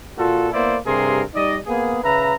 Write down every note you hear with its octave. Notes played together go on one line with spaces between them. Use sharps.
A#2 F4 F#4 A4
A#3 B3 E4 C5 D5
G2 C3 G#4 A#4 C6
G3 D#4 D5 D#5
A#3 B3 G#4
C#3 B4 E5 A#5